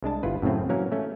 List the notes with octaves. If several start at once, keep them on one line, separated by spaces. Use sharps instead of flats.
C2 G#3 D4 A5
G1 E4 F4 B4
F#2 A2 C#3 A3 C4
E3 F#3 A#3 C#4 A#4
A3 C#4